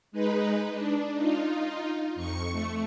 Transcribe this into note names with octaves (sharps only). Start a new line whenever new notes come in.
G#3 D#4 B4
D4
D#4 F4
F2 C#6 C#7
A3